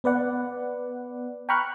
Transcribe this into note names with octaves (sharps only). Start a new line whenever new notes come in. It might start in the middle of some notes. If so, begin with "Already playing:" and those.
B3 B4 D5 F#5
G5 A#5 B5 C#6 F6 F#6